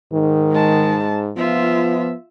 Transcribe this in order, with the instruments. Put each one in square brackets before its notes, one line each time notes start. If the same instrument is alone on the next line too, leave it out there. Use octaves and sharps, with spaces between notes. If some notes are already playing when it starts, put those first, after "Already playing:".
[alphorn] G#2 [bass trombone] D#3
[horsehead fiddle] G#3 A5
[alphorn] F3 [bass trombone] B3 [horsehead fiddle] F4 E5